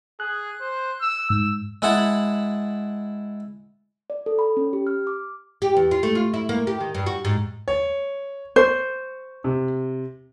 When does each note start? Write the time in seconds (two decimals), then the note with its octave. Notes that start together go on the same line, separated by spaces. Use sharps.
0.20 G#4 F#6
0.61 C5
1.01 E6
1.30 G#2 E6
1.82 G#3 E4 F#5 A5 B5
4.10 D5
4.26 A4
4.39 B5
4.57 C#4
4.73 G4
4.87 F6
5.07 D6
5.62 G4
5.77 E2
5.91 F4
6.03 A3
6.15 F4
6.34 E4
6.49 A#3
6.67 G4
6.80 D#3
6.95 G2
7.06 F#4
7.25 G#2
7.68 C#5
8.56 C5 C#6
9.44 C3